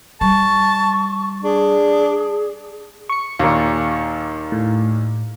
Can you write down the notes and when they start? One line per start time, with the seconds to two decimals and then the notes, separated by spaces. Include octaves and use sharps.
0.21 G3 A5 C#6
1.43 D4 G#4
3.09 C#6 C#7
3.40 D#2 A#2
4.52 A2